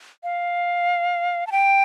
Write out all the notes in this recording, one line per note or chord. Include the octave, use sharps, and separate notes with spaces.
F5
A5
G5